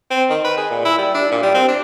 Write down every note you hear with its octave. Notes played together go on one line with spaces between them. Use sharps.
C4
D#3
B4
G#4
A#2
E4
G3
D4
A#2
G3
C4
D4